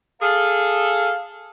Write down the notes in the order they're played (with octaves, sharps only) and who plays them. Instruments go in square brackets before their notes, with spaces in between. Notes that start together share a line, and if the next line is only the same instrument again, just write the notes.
[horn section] G#4 A4 [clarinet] F5